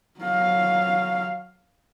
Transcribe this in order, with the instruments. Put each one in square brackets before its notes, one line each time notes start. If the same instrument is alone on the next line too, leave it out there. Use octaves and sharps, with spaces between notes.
[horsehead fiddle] F#3 F5